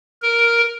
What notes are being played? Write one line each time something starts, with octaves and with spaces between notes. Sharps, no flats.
A#4